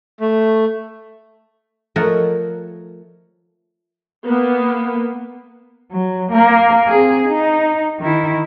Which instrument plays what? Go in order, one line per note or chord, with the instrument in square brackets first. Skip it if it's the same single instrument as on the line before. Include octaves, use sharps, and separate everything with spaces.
[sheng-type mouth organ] A3
[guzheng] F3 A3 A#4 C#5 D#5 F#5
[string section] A#3 B3
[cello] F#3
A#3 A#4
C4 G#4
D#4
D#3 E4